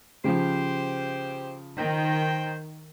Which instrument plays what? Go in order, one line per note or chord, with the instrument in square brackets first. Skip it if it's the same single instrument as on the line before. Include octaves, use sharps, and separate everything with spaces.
[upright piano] C#3 F3 [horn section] G4 C5
[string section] D#3 [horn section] C5 G5